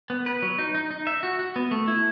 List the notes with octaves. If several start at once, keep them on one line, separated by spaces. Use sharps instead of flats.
B3
B4
F#3
D#4
D#4
D#4
E5
F#4
F#4
B3
A3
E4